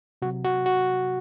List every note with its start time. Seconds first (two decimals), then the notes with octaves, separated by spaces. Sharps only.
0.22 C3 F#3 F#4
0.44 F#4
0.66 F#4